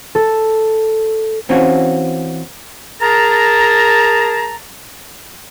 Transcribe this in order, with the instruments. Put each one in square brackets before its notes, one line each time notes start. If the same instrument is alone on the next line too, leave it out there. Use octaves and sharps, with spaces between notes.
[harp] A4
[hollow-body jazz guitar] E3 C4 C#4 F4 F#4
[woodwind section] G#4 A#4 A5 A#5